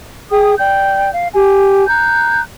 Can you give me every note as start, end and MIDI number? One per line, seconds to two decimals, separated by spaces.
0.30 0.54 68
0.30 0.54 79
0.30 0.54 87
0.58 1.09 74
0.58 1.09 79
0.58 1.09 91
1.12 1.28 77
1.33 1.86 67
1.33 1.86 80
1.87 2.41 82
1.87 2.41 90
1.87 2.41 91